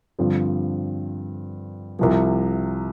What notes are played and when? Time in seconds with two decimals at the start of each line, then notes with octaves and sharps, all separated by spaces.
0.19 G2 D3 F3 C4
1.99 C2 C3 F3